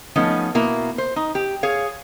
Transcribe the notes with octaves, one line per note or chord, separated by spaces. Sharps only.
F3 A3 B3 C#4 D#4
B2 A#3 E4
C5
D#4
G4
G#4 C#5 F5